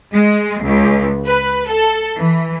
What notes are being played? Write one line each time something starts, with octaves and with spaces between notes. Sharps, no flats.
G#3
C#2
B4
A4
E3